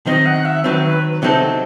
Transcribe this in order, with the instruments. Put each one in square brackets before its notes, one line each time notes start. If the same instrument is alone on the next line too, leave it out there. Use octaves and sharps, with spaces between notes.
[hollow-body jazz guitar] D#3 F#3 C4 [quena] D#5
[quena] F#5
E5
[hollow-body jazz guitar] D#3 F#3 C4 [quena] B4
[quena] B4
[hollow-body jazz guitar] C3 F#3 C4 D#4 A4